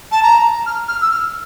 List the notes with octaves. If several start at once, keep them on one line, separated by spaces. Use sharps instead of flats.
A5
A#5
F6
F6
E6
F6